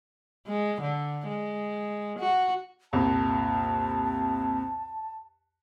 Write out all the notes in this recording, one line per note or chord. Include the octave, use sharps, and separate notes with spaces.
G#3
D3
G#3
F#4
C2 F2 A#2 A5